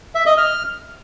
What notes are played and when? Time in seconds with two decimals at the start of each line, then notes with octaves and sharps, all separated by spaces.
0.15 E5
0.26 D#5
0.37 F6